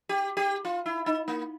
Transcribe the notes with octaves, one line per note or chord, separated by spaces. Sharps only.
G4
G4
F4
E4
D#4
A#3